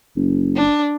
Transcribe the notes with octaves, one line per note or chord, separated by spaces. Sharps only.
F#1
D4